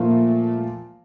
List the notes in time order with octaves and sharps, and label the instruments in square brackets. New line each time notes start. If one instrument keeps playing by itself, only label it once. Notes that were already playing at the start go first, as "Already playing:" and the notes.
Already playing: [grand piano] A#2 F3 A#3 F4 [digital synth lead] A3